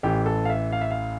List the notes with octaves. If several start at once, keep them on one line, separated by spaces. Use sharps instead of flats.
A1 A2 E3 G4
A4
F5
E5
F5
E5
F5